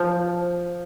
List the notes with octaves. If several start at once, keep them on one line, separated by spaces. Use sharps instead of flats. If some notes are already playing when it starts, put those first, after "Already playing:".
Already playing: F3